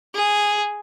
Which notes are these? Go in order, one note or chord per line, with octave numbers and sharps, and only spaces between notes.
G#4